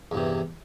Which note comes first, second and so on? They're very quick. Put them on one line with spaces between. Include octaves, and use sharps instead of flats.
E2 G2 C3